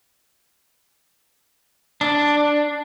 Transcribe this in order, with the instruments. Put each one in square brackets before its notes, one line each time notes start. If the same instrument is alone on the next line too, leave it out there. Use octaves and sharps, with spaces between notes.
[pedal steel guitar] D4